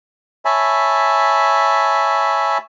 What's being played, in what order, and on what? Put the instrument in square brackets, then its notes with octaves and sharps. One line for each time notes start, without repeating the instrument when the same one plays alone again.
[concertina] C#5 E5 G#5 A5 B5